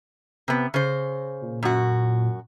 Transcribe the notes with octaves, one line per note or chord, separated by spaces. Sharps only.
C3 B3
C#3 C5
A#2
F#2 F#4